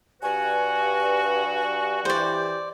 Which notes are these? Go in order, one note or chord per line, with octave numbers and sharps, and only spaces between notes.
G2 F#4 B4 G#5
E3 G4 C5 D5